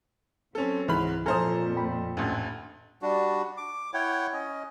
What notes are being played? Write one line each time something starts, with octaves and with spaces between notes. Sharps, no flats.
F#3 C4 C#4 A4
C#2 G#2 E3 B5 F6
F2 A#2 A4 C5 G#5 A#5 D#6 F6
G5 B5
A1 D2
G3 D4 F#4
D6
E4 C#5 F#5 G5
C#4 D#5